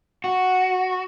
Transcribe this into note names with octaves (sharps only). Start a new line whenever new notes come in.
F#4